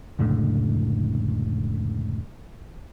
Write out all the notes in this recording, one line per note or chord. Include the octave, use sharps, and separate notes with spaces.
F1 C#2 A2 D3